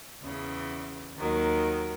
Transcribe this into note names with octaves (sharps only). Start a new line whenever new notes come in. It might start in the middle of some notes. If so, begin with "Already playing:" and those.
E2 C#3 E3
D#2 D#3 F#3